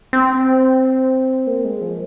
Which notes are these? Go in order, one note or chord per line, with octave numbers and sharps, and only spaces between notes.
C4
A#3
G#3
F3